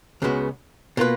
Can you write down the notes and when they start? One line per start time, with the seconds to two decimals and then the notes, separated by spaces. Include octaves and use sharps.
0.22 C#2 C#3 G#3 B3 F#4
0.97 B2 A#3 F4 B4